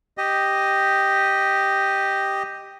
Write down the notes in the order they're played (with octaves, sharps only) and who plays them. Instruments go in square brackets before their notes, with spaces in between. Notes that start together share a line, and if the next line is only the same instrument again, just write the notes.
[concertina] G4 D#5